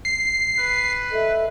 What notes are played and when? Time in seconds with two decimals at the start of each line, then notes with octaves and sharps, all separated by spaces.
0.05 C7
0.58 B4
1.12 A4 D#5 E5